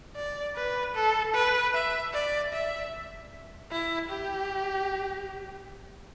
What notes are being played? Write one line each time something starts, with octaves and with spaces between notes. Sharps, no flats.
D5
B4
A4
B4
E5
D5
E5
E4
G4